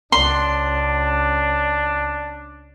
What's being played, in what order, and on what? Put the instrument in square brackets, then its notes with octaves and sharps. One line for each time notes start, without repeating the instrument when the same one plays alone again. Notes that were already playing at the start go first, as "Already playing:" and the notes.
[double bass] C#2 [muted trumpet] D4 [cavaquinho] C6